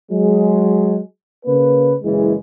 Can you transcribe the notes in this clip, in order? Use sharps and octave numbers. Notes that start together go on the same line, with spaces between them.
F#3 G#3
C#3 A#3 B4
F#1 E3 G#3